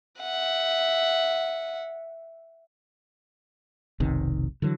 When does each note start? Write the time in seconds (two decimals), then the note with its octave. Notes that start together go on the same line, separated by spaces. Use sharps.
0.20 E5 F#5
4.00 F1 B1 C3 D#3
4.62 D3 E3 F#3